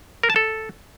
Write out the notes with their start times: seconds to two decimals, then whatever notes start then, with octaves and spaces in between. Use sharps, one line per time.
0.23 A#4
0.30 A5
0.36 A4